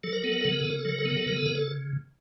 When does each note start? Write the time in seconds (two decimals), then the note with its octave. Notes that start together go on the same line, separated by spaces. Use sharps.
0.03 F#3 A4
0.13 A#4
0.23 B3 A4
0.32 A#4
0.41 C#3 A4
0.51 A#4
0.60 A4
0.65 C#3 A#4
0.79 A4
0.85 F#3 A#4
0.99 A4
1.05 B3 A#4
1.17 A4
1.26 C#3 A#4
1.37 A4
1.46 C#3 A#4
1.55 A4